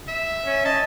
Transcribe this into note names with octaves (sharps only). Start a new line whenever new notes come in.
E5
C#4
D#5 A5